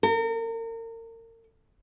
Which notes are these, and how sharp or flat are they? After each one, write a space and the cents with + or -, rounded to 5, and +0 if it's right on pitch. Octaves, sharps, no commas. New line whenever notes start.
A#4 -35